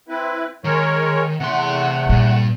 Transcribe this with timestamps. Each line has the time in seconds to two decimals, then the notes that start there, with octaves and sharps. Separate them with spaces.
0.09 C4 E4 B4
0.64 D#3 G#3 A#4 C#5
1.40 E2 C3 A3 F#5 C6
2.09 G2 A#2